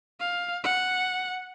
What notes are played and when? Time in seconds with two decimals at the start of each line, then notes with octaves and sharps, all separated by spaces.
0.20 F5
0.64 F#5